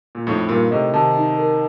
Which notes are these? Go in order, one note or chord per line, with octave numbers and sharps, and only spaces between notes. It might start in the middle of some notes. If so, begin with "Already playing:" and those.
A#2
F2 A2 D#4
G2 A#2 A#4
A2 C3 D#5
C3 D#3 A5
D#4
A#4